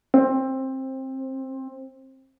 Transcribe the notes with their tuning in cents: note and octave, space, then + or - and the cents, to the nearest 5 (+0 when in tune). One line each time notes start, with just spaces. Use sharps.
C4 +20